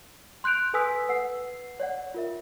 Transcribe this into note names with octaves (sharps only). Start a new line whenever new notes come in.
C6 F#6 G6 D7 F7
A4 B4 G#5 D#6 E6 B6
B4 F#5 E6 C7
C#5 D5 F#5
F4 A#4 E5